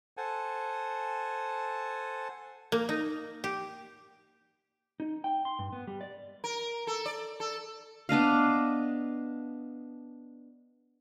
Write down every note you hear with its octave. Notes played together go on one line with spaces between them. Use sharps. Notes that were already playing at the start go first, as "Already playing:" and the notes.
A4 C5 F#5 G#5 A5
A#3
D#4
G4
D#4
G5
C6
G2
B3
G3
D5
A#4
A4
D5
A4
B3 D4 D#5 F5